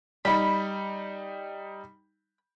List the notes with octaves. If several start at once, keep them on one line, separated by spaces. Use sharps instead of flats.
G3 D#4 B5